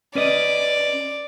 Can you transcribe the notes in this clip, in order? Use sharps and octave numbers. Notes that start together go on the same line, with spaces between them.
C#4 B4 D5 D#5